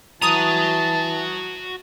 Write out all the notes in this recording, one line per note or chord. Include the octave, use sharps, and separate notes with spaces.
E3 F#4 A5 A#5 D#6